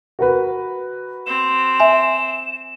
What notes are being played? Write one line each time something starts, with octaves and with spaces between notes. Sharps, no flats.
F#4 A#4 B4
C4 E7
E5 G#5